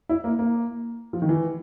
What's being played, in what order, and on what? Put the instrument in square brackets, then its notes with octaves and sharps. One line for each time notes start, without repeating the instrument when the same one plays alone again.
[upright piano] E4
A#3
A#3
F3
D#3
E3